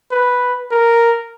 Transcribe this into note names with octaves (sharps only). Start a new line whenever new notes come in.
B4
A#4